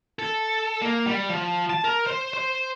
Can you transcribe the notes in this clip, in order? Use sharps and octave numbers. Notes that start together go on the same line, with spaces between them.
A4
A#3
G3
F3
A5
A#4
C5
C5